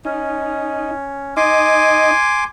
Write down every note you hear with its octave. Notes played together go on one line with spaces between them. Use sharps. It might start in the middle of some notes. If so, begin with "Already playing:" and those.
C#4 D#4
D#4 D#5 G#5 C6 D6